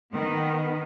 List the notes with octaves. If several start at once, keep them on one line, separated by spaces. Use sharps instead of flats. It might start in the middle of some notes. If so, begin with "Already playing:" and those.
D#3 B3